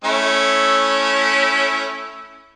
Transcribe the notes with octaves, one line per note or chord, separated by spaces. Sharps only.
A3 C#4 E4